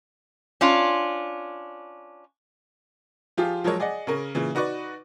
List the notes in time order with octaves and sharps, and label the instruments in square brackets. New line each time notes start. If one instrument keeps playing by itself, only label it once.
[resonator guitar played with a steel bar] C#4 D4 F4
[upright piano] F3 F4 G4 G#4
F3 F#3 G#3 A#4 C#5
G#4 D5 D#5 F#5
C#3 C#4 A#4
A#2 C#3 E3
D#4 F#4 B4 D5 C#6